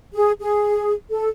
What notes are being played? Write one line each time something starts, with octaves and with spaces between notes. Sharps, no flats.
G#4
G#4
A4